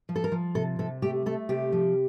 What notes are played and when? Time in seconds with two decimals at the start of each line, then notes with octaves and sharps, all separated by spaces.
0.09 F3
0.16 A4
0.24 A#4
0.32 F3
0.55 C3 A4
0.79 C3 A4
1.02 A3 G4
1.26 A3 A4
1.49 C3 G4
1.72 F3